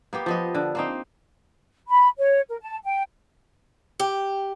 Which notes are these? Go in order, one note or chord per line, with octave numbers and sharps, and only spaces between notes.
A#3 B3 G4
F3 B3 D#5
D3
A#3 C4 D#4
B5
C#5
A#4
A5
G5
G4